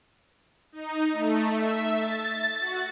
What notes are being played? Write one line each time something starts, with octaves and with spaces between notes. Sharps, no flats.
D#4
A3
E5
A6
F#4